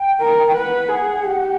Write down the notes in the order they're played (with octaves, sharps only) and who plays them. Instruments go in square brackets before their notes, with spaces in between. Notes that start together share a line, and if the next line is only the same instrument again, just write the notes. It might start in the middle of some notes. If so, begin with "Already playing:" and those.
Already playing: [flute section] G5
[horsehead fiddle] A#4
[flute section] G5
[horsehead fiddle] B4 [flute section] F#5
[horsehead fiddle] G#4
G4